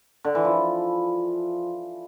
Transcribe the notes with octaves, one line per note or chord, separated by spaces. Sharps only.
D3
E3
F3